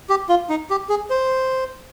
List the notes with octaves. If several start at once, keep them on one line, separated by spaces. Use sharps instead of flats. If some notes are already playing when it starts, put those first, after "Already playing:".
G4
F4
D#4
G4
G#4
C5